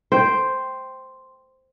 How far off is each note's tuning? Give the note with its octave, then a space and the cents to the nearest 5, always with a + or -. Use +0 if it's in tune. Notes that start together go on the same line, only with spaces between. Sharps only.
C5 +0 G5 +0